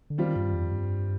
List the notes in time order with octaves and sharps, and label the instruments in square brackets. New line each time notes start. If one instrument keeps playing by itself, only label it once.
[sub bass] D3
[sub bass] D#3 [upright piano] G3 C4 F4
[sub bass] G2
F2
G2